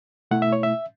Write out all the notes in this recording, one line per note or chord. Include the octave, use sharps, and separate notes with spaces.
B2 A3 E4 F#5
E5
C#5
E5